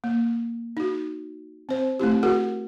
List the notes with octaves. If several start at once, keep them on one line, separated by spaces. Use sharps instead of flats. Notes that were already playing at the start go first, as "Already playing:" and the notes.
A#3
D#4 F#4
C4 C5
A3 C4 E4 G4
F#4 G#4 A#4 F#5